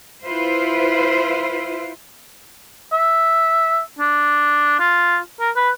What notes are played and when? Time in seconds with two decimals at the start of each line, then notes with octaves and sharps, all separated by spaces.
0.24 E4 F4 B4 C5
2.92 E5
3.99 D4
4.80 F4
5.40 A#4
5.56 B4